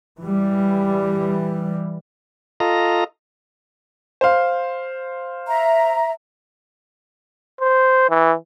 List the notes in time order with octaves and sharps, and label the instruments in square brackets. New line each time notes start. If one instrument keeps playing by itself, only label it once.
[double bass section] E3 G3
[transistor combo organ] F4 A4 D#5 A#5
[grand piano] C5 F5
[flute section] E5 A#5
[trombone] C5
E3